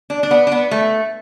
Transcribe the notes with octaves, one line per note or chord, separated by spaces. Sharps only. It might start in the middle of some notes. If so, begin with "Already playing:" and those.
D4
D4
B3
D4
B3
A3